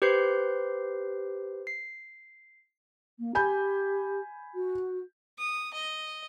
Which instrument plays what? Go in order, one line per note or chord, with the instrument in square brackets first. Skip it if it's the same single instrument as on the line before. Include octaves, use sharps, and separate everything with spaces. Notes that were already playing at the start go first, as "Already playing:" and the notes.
[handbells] G4 B4 C5 G6 C7
C7
[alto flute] A#3
[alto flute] G4 [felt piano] G#5 B5 G6
[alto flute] F#4
[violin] D#6
D#5